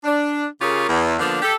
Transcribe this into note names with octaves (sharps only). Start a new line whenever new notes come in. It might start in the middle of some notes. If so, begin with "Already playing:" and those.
D4
C#3 F4 G4 G#4 A#4 C#5
E2
D3 F3 A#3 B3 D4
G4 A4